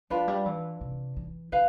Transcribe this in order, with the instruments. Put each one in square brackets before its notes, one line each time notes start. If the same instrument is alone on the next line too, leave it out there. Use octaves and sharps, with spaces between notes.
[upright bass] F3 [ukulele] D4 F4 B4
[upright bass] G3
E3
C3
E3
[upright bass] D3 [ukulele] B4 F5